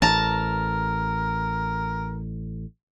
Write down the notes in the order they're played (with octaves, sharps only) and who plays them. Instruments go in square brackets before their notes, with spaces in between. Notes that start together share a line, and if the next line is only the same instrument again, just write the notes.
[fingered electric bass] A1 [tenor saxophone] A#4 [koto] A5 A#5